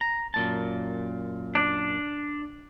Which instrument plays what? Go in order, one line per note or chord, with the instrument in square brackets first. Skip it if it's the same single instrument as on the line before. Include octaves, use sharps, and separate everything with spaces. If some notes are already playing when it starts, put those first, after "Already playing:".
[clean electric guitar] A#5
F#2 A#2 A5
[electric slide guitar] D4